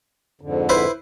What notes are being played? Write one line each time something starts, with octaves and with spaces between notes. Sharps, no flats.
F2 G#2 D3
E4 B4 C5